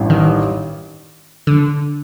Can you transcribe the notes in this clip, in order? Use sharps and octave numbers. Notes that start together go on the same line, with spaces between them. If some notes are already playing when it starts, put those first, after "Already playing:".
Already playing: A1 G2 E3
D#3
D3